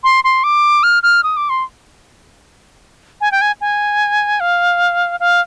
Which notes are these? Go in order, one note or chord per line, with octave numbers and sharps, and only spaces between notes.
C6
C6
D6
F6
F6
D#6
D6
C6
G#5
G5
G#5
G#5
F5
F5